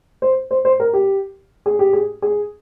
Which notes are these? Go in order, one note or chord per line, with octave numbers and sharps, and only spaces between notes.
C5
C5
C5
A#4
G4
G#4
G4
G#4
G#4